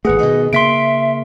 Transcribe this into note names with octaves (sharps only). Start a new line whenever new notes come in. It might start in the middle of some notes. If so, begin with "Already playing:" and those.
G#1 A3 G#4 B4 F#5
B2 D#3 D#5
C#3 A#3 E5 C6 B6 D7